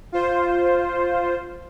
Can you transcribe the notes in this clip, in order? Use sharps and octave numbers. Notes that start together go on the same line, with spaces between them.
F4 C5